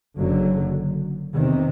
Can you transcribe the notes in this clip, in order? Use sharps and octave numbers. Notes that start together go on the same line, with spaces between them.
F#1 F#2 D3 F#3
E2 C3 D#3